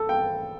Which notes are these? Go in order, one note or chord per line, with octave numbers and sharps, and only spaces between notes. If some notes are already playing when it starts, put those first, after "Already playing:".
Already playing: A4
G5